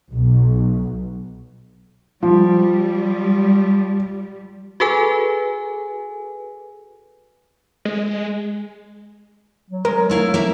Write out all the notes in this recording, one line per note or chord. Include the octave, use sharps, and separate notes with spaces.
B1
F3 G3
F#4 G#4 A4 B4 G#5
G#3
F#3
G#3 A#4
A3 E4 F5
A#3 E4 E5